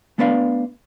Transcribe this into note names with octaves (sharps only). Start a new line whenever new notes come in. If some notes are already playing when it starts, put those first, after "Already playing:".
A3 B3 D4 B4 D5 F5